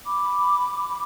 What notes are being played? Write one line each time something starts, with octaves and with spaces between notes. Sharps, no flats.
B5 D6